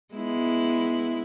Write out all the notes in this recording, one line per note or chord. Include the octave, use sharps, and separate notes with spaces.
G#3 B3 E4